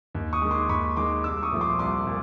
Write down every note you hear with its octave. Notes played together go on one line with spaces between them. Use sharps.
D#2
C#6 D#6
D#3 G#3
C6 D6
D#2 B5 C#6
D#3 G#3 C6 D6
C2 D6 E6
C#6 D#6
A#2 F3 A3
C6 D6
C2 C6 D6
A#2